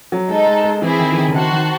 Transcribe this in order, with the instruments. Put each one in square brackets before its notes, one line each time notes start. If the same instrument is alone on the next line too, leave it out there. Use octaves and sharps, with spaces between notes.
[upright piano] F#3
[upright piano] G#3 [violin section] D#4 A4 C5
[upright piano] G#3
G#3
[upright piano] E3 [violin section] C4 E4 G#4
[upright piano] D#3
E3
D#3
C#3
[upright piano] D#3 [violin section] F#4 C5 F#5 A5
[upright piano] D#3